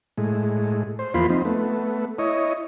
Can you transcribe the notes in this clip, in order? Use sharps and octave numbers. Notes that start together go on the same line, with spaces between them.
A2 G#3
C5
E2 F3 A#3 F4 B5 C6
F3 C4 D#4
A3 B3
E4 C#5 D#5